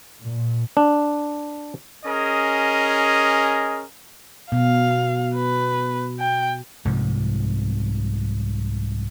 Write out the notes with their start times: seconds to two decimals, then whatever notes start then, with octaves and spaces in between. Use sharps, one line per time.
0.22 A#2
0.77 D4
2.05 C#4 G#4 A#4 D#5
4.52 B2 F5
5.35 B4
6.20 G5
6.85 C2 G#2 C3 F3